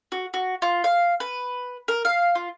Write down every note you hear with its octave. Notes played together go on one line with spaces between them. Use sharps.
F#4
F#4
F4
F5
B4
A#4
F5
F4